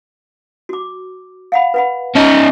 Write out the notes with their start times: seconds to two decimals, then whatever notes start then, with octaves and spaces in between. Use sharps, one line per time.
0.69 F#4 D6
1.52 F5 F#5 B5
1.74 B4 F#5 B5
2.15 C#4 D#4 A5 A#5